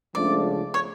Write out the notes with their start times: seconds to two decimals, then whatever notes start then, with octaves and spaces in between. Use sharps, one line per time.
0.14 C#2 C#3 F3 A3 D4 D5
0.74 C#5